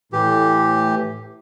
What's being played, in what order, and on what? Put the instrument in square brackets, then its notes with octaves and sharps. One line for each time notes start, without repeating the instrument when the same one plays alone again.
[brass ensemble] A2 [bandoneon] E3 G4